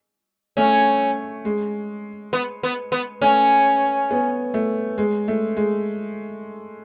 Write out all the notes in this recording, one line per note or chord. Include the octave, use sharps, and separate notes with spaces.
A3 C#4
G#3
B3
B3
B3
A3 C#4
B3
A3
G#3
A3
G#3